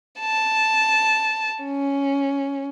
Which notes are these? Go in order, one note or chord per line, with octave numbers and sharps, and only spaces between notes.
A5
C#4